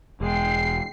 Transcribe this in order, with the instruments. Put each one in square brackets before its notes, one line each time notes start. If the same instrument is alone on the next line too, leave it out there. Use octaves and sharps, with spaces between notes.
[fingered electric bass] E1 [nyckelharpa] G#3 G5 [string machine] C7